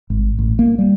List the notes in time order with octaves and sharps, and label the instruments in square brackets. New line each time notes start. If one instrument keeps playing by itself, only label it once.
[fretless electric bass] G#1
A1
A#3
G3